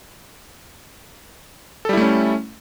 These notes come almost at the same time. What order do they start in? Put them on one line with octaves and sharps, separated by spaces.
A4 G3 E4 A3 C#4